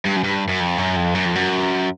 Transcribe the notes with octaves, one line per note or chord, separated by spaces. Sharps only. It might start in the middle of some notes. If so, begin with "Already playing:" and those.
G2
F#2
G2
F#2
F2
F#2
F2
F#2
F2
F#2